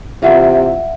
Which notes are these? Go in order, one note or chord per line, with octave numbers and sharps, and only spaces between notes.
C3 E3 A#3 F4 E5 F#5